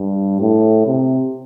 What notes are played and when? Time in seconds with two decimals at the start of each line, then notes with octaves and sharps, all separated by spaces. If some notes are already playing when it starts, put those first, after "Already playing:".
Already playing: G2
0.40 A2
0.87 C3